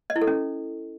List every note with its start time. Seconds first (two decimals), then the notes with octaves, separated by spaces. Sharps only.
0.10 D#5
0.16 E4
0.22 A4
0.27 C#4